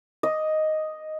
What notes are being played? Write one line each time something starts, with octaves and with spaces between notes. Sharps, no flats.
D#5